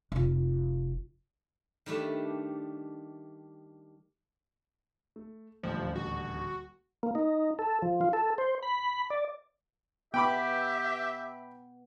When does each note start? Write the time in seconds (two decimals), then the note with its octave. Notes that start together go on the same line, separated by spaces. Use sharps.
0.12 F1 F4
1.86 D#3 G3 A3 D4
5.16 A3
5.63 D#1 A1 D2 F3
5.96 F#4
7.03 A#3
7.15 D#4
7.59 A4
7.82 F3
8.01 F4
8.13 A4
8.38 C5
8.63 B5
9.10 D5
10.14 B3 G4 E5 G5 B5 D6